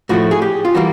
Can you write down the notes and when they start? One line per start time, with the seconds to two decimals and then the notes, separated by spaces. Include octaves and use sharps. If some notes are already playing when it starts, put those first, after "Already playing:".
0.09 A2 F3 A3 F#4
0.31 G#4
0.42 G4
0.65 F4
0.74 E3 G3 A#3 F#4